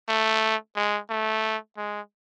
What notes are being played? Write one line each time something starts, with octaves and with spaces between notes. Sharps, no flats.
A3
G#3
A3
G#3